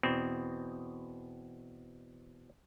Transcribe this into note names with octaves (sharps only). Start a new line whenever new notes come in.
E2 B2 C4